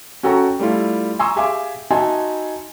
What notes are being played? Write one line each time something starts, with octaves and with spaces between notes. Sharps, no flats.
C#4 F#4 A4 G5 A#5 C#6
G3 A3 E4 F4
G#5 A#5 C6 C#6 D#6 E6
G4 G#4 E5 F5 G#5 D6
D#4 F#4 E5 G#5 A5 C6